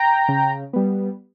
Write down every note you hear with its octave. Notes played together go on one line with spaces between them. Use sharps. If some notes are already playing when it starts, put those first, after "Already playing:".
Already playing: G5 A#5
C#3
G3 B3